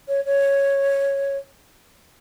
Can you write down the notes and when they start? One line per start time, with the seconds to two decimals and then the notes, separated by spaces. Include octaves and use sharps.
0.08 C#5
0.26 C#5